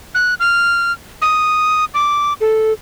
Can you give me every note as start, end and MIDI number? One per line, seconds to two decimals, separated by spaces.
0.15 0.34 90
0.40 0.92 89
1.22 1.85 87
1.94 2.33 86
2.41 2.73 69